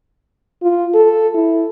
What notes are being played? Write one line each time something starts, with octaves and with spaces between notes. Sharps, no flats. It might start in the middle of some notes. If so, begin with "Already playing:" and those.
F4
A4
E4